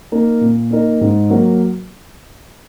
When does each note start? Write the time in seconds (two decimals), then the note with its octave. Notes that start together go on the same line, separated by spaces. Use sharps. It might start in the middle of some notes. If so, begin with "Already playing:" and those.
0.12 A#3 D#4 A#4
0.41 A#2
0.71 A#3 D#4 A#4
1.01 G#2
1.30 F#3 A#3 F#4 A#4